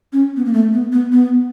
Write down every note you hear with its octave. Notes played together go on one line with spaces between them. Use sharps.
C#4
B3
A#3
A3
B3
B3
B3